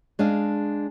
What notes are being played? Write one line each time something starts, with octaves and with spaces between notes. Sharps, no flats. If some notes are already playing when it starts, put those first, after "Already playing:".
G#3 D4 D#5 F5